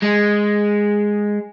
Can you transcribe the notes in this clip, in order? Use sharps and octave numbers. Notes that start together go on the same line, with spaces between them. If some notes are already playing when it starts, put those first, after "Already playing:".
G#3